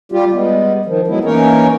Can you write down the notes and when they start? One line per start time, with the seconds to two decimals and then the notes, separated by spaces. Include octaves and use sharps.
0.12 G3 F4 G4
0.32 G3 G#3 B3
0.86 D#3 F3
1.08 F#3 G#3 B3 E4
1.25 E3 A#3 C#4 D#4 A#4 C#5